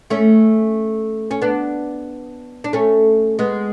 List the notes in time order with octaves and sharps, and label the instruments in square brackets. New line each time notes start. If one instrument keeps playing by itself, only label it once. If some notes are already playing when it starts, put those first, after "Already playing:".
[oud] A3 C#4
C#4
B3 D4
D4
A3 C#4
G#3 B3